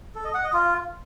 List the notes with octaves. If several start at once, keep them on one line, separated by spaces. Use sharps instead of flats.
A4
D#5
F#5
D#5
F4